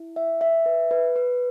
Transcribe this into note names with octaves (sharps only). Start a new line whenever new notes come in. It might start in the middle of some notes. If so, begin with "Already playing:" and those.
Already playing: E4
E5
E5
B4
B4
B4